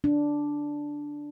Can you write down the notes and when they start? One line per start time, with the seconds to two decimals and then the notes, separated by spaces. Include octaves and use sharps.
0.04 D4